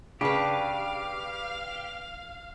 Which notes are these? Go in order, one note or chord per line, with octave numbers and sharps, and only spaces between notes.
C#3 D4 G4 B4 F5